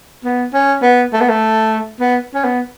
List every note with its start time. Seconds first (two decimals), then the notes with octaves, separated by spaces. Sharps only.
0.24 B3
0.54 C#4
0.83 B3
1.13 A3
1.21 B3
1.29 A3
2.00 B3
2.35 C#4
2.44 B3